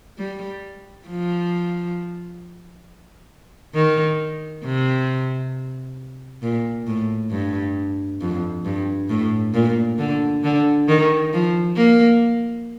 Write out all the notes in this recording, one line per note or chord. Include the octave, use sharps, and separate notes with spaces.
G3
F3
D#3
C3
A#2
A2
G2
F2
G2
A2
A#2
D3
D3
D#3
F3
A#3